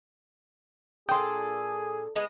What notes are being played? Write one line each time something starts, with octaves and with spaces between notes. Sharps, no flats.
A#2 D4 G#4 A4 G5 C6 D#6
G#3 B3 D#4